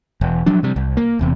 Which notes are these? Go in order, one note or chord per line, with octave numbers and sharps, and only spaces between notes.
E1
F3 F#3 D4
C3 G3
C2
A#3
E1 E2 C3